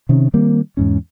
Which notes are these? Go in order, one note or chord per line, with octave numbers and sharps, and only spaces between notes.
C3 D#3 C#4
D#3 G3 A#3 C4
E2 G#2 C#4